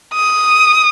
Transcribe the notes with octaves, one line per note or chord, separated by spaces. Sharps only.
D#6